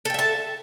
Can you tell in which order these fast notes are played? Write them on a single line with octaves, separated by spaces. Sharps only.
A4 G5 E5 A5